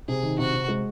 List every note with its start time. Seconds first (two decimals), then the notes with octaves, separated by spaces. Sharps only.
0.08 C3 G#4
0.23 D#3
0.39 C3 F#4
0.53 C3
0.68 G#3